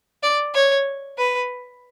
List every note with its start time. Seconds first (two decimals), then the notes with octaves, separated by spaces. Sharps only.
0.23 D5
0.54 C#5
1.18 B4